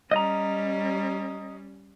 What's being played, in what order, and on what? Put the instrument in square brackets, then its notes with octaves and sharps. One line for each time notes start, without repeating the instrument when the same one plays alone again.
[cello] G3 C#4 [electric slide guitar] D#5 A#5